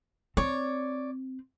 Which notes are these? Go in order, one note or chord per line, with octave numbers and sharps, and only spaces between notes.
C4 C#5 D5